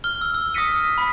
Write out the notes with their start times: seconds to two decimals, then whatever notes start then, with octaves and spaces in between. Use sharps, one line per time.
0.04 F6 G7
0.21 E6
0.34 E6
0.54 D#6 F6 A#6 B6 C#7 D#7
0.98 B5 B6